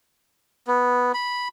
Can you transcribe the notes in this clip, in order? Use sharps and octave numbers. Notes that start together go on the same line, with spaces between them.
B3
B5